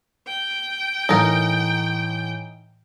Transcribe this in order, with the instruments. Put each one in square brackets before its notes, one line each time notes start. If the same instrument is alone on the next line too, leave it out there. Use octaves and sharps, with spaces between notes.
[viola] G5
[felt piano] A2 E3 [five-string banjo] D#4 A#4